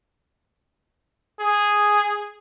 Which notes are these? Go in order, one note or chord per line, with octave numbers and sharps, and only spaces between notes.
G#4